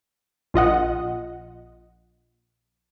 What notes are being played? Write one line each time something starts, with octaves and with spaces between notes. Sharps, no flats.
A#1 F4 D#5 F#5